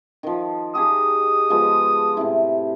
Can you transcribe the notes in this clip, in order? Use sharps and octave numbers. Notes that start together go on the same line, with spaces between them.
D#3 F3
G4 G#4 A#5 D#6
F3 G#3 B3
A2 C3 E4